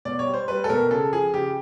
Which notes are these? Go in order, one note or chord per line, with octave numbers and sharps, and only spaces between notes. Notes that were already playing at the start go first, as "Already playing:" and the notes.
B2 D5
C#5
G3
C5
G3 B4
A4
B2 A#4
C#3 A4
F3 G#4
C#3 G4